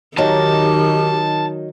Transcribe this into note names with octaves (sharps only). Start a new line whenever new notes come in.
D#3 F#3 D#4 G4 A#4 A5